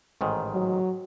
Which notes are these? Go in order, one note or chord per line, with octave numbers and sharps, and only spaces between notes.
A1 G#2 D#3
F#3